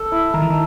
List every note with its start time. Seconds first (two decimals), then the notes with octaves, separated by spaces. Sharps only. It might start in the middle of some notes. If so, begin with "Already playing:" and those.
Already playing: A4
0.12 E4
0.34 D#3 A#4
0.42 E3
0.50 D#3